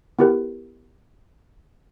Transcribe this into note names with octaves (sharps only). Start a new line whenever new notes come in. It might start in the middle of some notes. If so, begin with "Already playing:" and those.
B3 E4 G4 A#4 B4